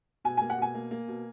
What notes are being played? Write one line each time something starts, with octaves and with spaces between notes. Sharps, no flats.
B2 G#5
A#3 G#5
F#5
B2 G#5
A#3
A#3
B2